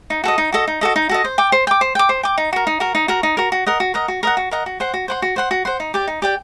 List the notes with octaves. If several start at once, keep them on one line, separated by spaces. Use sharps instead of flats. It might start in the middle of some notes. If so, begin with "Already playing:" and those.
D#4
F#4 A4 D#5
D#4
F#4 A4 D#5
D#4
F#4 A4 D#5
D#4
F#4 A4 D#5
C5
G5 D6
C5
G5 D6
C5
G5 D6
C5
G5 D6
D#4
F#4 A#4
D#4
F#4 A#4
D#4
F#4 A#4
D#4
F#4 A#4
F#4
A#4 D#5 F#5
F#4
A#4 D#5 F#5
F#4
A#4 D#5 F#5
F#4
A#4 D#5 F#5
F#4
C5 F#5 C6
F#4
C5 F#5 C6
F#4
C5 F#5 C6
F#4
C5 F#5 C6
D#4
G4 D5 G5
D#4
G4 D5 G5